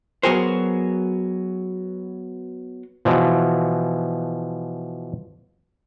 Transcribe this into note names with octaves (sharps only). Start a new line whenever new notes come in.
F#3 B3 F#4 G#4 A#4 C5
B2 E3 F3